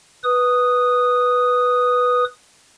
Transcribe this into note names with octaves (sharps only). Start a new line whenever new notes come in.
B4 D#6